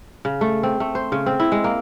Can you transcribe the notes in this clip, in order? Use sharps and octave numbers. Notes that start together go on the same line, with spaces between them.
C#3
A3
C4
A3
C5
C#3
C4
E4
G#3
A#3